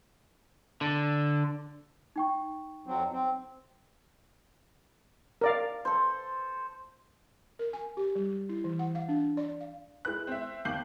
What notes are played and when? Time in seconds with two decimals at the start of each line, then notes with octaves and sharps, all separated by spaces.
0.81 D3
2.16 D#4 G5 C#6
2.87 F2 F#3 C4
3.12 C4
5.41 A#4 D5 F5
5.85 A4 C5
7.59 A#4
7.73 G#5
7.97 G4
8.15 G3
8.49 E4
8.64 E3
8.79 F#5
8.95 F5
9.09 D4
9.37 D5
9.60 F5
10.05 G#3 E4 B4 F#6
10.27 C4 E5
10.65 D#2 F5 D6 G6 C7 F#7